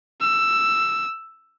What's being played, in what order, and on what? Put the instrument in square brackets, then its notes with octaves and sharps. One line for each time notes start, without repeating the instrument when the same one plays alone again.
[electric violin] E6